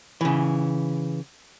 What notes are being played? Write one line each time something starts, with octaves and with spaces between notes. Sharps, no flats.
C#3 E3